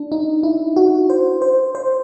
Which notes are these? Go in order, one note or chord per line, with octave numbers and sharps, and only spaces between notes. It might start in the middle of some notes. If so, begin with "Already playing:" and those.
Already playing: D4
D#4
E4
F#4
C5
C5
C5